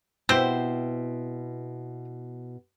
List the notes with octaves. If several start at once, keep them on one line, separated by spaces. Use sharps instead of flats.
B2 C4 E4 G4 C5